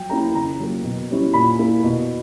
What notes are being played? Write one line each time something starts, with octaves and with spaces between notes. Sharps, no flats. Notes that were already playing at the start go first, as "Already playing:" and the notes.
Already playing: F#3 G5
A#3 C#4 E4 A#5
C#3 A#5
F#3 A#3
B2
G3 C#4 E4
A#2 B5
A#3 E4
B2